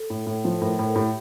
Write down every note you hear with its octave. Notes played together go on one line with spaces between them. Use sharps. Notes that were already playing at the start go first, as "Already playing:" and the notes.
Already playing: A4
A2
A2
F3 C5
A2 A#4
A2 A4
A2 G4